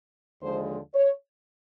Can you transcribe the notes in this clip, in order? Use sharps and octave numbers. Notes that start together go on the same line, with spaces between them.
D#2 D3 F3 G#3 C5
C#5